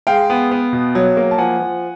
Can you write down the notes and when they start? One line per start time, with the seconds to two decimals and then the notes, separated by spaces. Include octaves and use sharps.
0.07 G#3 F5 G5
0.30 B3
0.51 B3
0.73 B2
0.95 F#3
1.17 A#3
1.31 A5
1.38 F3 F#5 G#5
1.59 F3